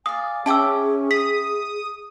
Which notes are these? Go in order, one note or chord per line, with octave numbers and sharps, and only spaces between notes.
D5 F5 G#5 D#6
C#4 E4 G#4 G5 A5 D6 E6
D#6 B6